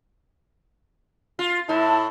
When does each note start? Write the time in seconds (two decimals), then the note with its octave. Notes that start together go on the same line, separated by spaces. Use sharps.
1.39 F4
1.69 A2 E4 A5